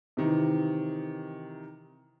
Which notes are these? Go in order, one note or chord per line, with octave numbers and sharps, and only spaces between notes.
C3 D#3 E3